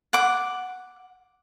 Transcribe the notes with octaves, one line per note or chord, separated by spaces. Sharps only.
F#5 D6